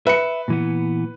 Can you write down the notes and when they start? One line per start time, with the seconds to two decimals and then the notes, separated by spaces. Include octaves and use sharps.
0.07 B4 E5 C#7
0.48 A#2 E3 B3